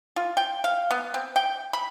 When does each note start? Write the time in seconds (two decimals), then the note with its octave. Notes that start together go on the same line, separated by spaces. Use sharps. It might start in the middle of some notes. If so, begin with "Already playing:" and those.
0.16 F4
0.37 G5
0.64 F5
0.91 B3
1.14 C4
1.36 G5
1.73 B5